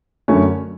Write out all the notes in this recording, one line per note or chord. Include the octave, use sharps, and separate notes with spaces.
F#2 D3 F#3 A3 C#4